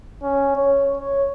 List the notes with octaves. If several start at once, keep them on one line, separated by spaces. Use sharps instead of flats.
C#4
C#5
C#5